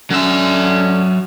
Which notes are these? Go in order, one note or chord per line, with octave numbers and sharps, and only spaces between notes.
D3 F#3 C#4 E5